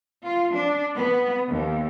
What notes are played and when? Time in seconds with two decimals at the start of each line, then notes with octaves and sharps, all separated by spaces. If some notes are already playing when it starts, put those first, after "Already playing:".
0.25 F4
0.55 D4
0.94 B3
1.48 D#2